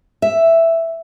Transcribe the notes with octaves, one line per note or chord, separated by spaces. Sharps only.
E5